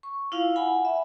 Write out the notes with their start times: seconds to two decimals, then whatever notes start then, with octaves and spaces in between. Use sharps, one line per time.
0.03 C#6
0.32 E4 F4 F5
0.56 F#5 G#5 B5
0.85 E5